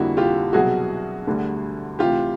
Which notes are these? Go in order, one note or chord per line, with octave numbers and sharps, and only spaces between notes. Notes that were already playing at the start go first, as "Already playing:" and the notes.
Already playing: F2 D3 G3 A#3 E4 F#4
F4 G4
C2 B2 F#3 F#4 G#4
D2 D3 G3
D2 C3 E3 F4 G4